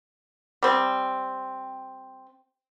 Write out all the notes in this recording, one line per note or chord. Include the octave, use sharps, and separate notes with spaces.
G3 C4